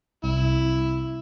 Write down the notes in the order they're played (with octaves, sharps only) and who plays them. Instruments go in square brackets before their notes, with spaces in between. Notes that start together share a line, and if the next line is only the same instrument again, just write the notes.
[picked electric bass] C2 [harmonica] E4